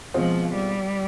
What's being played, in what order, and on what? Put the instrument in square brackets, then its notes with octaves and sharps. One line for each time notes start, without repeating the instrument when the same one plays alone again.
[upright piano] B2 G#3 C4 F4 [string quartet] F3
[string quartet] G3